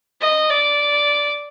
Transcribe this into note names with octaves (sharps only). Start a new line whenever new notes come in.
D#5
D5